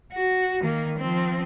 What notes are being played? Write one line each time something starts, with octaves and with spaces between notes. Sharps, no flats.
F#4
D#3 A#3
F3 C4